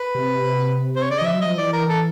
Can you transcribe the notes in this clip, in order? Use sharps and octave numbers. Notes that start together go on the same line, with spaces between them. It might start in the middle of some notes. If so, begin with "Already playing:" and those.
Already playing: B4
C3
C5
C#5
C#3 D5
D#5
F3 E5
F#3
F3 D#5
E3 D5
A#4
A4